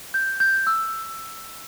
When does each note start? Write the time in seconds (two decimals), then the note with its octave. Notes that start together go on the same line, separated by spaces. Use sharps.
0.14 G6
0.40 G6
0.67 E6